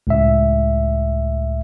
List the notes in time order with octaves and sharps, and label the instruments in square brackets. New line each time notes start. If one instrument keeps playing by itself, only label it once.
[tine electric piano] C#2 A2 E5